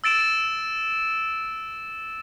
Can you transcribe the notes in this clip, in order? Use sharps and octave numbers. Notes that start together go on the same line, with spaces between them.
E6 A6 D7 E7